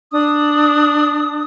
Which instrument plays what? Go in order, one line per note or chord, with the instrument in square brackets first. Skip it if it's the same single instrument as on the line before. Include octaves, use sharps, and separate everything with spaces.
[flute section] D4 D#6